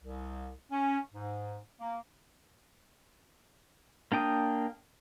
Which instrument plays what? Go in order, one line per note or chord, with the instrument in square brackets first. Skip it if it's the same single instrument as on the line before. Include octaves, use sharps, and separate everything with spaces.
[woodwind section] C2
C#4
G#2
A#3
[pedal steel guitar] A#3 D4 G5 D#6